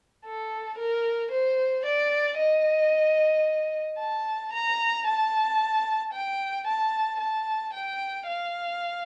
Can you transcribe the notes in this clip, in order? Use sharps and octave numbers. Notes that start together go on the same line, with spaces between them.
A4
A#4
C5
D5
D#5
A5
A#5
A5
G5
A5
A5
G5
F5